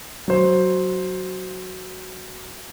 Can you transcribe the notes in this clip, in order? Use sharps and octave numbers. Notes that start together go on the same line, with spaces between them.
F#3 C5